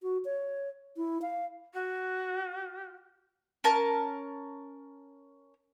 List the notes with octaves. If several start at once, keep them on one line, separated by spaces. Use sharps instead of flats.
F#4
C#5
E4
F5
F#4
C#4 A#4 A5